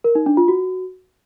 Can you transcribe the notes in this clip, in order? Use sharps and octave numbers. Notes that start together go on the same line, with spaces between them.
A#4
D#4
D4
F4
F#4